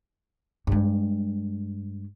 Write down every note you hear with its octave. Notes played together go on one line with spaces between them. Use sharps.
G2 G#3